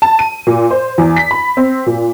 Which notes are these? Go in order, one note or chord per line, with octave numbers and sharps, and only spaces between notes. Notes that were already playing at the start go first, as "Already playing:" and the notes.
A5
D#7
A#2
C5
E2
B6
B5
C4
A#2